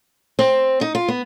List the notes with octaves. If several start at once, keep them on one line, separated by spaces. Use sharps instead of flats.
C4
D#4
F4
B3